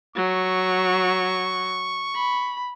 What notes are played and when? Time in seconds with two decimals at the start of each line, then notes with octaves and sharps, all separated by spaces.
0.16 F#3 C#6
2.15 B5